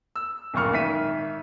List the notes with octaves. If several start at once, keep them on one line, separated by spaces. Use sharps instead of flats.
E6
D1 F#2 A#2 A#4 C#6 F6
G#1 D#3 E5 B6 D#7